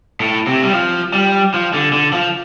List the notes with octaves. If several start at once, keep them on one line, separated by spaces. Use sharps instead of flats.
A2
C3
G3
F3
G3
F3
D3
D3
F3